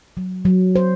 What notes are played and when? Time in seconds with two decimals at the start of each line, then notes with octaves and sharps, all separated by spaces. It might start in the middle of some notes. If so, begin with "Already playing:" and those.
0.17 F#3
0.45 F#3
0.76 C5